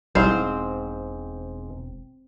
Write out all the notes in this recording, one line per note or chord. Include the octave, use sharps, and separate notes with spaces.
E1 B1 G#2 G3 C4 E4 C5 F5